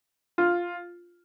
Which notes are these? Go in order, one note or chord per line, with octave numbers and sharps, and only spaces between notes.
F4